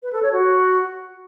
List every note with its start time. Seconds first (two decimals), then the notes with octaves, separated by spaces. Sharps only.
0.03 B4
0.13 A4
0.23 C#5
0.32 F#4